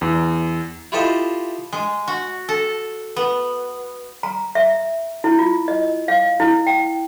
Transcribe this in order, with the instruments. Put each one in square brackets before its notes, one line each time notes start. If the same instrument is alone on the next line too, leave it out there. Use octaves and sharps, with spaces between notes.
[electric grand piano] E2
[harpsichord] E4 F4 G4 A4 C5 D#5
[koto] G#3
F#4
A4
B3
[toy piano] A#5
E5
E4
F4
D#5
F5
E4
G5